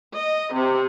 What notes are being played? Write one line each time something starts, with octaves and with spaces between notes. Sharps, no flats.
D#5
C3